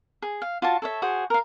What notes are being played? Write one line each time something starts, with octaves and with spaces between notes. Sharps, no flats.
G#4
F5
F4 F#4 A5
A4 C#5 E5
F#4 G#4 C5
A#4 F5